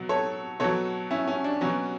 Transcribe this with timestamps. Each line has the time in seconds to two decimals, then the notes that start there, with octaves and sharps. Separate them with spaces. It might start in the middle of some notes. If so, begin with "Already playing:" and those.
Already playing: B2 F#3
0.09 A4 C#5
0.60 B2 F#3 A4 C#5
1.11 C#4 E4
1.28 C#4
1.44 D4
1.61 B2 F#3 C#4